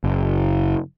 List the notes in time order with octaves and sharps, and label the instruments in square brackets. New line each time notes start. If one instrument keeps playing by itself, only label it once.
[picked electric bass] F#1